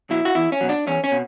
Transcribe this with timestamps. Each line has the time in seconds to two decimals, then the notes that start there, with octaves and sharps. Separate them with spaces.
0.10 B2 F#3 E4
0.25 F#4
0.35 E2 E4
0.52 C#4
0.61 B2 F#3
0.69 D4
0.87 E2 C#4
1.04 C#4
1.11 B2